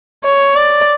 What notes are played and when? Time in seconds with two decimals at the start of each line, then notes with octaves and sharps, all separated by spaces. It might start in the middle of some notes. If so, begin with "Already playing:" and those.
0.24 C#5
0.56 D5